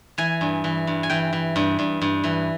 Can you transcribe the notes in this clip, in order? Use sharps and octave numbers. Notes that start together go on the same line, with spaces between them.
E3 G#5
G2
E3
G2
G#5
E3 G5
E3
G2
G2
G2
E3